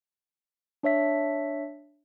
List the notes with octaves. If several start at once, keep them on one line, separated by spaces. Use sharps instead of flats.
D4 C#5 E5 B6